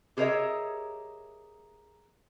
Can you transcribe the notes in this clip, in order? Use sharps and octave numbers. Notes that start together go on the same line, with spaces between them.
G4 G#4 A#4 C#5 D#5 E5